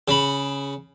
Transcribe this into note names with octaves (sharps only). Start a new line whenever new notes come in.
C#3 B5